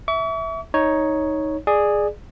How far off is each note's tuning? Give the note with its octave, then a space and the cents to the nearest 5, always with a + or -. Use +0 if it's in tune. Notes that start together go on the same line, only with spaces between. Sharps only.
E5 -10 C#6 +45
D#4 +5 C#5 +0
G#4 +0 D5 +20